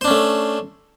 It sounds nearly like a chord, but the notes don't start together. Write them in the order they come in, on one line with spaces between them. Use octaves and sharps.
C5 D4 C#4 A3